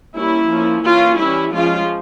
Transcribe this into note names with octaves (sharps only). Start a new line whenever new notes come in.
G3 A#3 C#4 E4
F3 A#3 C#4
E3 A#3 C#4 F4
E3 G3 C#4 E4
F3 G#3 C#4 F4